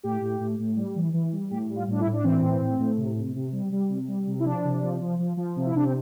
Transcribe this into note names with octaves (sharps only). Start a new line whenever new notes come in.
A2 G4
A2
A2
A2
G3
E3
E3
G3
A2 G4
G3
F4
A2 D4
E4
A2
D4
E3 C4
A2
A2
A2
C3
C3
C3
G3
G3
C3
G3
C3
E4
F3 D4
C3
F3
F3
F3
F3
C3
E4
C3 D4
C4